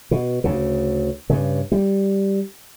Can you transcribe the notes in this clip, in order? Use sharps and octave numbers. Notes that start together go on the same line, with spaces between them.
B2
D2 C#3
G2 C#3
G3